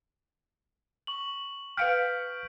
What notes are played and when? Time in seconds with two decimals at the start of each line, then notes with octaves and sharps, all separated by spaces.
1.07 C#6 F#7
1.77 B4 F5 G5 F6 G6 B6 D7